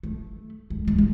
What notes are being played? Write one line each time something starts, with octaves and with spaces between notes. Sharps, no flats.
A3
G#3
G#3
G#3